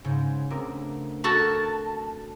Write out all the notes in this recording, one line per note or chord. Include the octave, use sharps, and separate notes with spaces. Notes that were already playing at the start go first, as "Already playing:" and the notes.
G#2 C#3
D2 C4 A#4 D6
F#4 A4 A#4 A5 G#6 A6